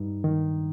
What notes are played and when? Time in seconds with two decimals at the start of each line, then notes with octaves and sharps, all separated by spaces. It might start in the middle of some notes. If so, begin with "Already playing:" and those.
Already playing: G2 D#4
0.24 D#3